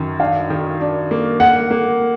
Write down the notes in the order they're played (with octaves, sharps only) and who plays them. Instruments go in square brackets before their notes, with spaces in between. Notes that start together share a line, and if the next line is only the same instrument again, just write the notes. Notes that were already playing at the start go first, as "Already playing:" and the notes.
Already playing: [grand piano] F#2 D#3
[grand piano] D4 [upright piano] F5
[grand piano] D#3
D4
A#3
[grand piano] A#3 [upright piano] F#5
[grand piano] A#3